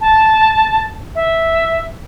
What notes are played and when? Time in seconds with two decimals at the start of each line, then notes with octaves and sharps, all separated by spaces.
0.01 A5
1.15 E5